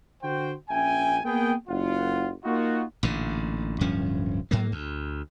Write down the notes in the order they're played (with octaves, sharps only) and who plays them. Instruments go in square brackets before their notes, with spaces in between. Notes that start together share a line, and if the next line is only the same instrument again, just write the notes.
[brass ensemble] D3 F#4 C5 G5
A#1 C#4 E5 G5 G#5
A#3 B3 G#4 G5
F#1 F4 F#5
A#3 D#4 F4 F#4
[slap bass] A1 A#2 D3
D1 G2 F3 C#4
G#2 F#3 A#3
D2